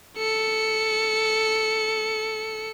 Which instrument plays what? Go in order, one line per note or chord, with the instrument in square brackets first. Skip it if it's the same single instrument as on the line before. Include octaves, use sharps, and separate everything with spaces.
[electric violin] A4 C#7